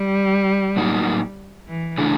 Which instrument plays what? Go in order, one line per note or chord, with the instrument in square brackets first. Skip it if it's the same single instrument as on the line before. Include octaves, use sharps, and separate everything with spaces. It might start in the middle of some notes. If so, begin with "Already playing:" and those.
Already playing: [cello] G3
[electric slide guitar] A2 F#3 A#3 D#4
[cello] E3
[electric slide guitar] C#3 E3 A3 D4